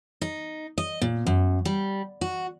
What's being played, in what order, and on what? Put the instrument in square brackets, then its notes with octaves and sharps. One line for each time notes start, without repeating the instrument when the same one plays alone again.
[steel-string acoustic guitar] D#4
D#5
A#2
F#2
G3
F#4